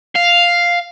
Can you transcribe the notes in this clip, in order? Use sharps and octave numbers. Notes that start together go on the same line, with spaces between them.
F5